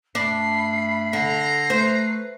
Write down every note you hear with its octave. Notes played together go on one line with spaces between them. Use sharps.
G2 A3 D4 B5 C7
D3 A#5 C7
A3 B4 C5